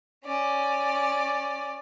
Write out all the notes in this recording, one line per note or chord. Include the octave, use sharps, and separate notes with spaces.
C#4 D5